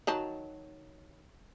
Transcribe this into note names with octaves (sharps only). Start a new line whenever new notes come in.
D#3 F#3 A5